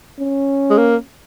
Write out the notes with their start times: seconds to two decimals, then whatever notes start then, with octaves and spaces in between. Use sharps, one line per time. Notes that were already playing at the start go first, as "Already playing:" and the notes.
0.19 C#4
0.70 G#3
0.78 A#3